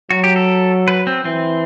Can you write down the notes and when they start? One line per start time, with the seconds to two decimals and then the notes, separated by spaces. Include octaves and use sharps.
0.10 F#3 F#4
0.24 G4
0.36 A4
0.88 B4
1.07 C4
1.25 E3 C4